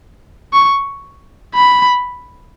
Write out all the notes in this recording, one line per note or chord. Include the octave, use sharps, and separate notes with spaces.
C#6
B5